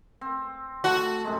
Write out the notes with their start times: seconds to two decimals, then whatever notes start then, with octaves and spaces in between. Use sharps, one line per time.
0.21 C4
0.84 A3 F#4 A5
1.24 F#2 C3 G#3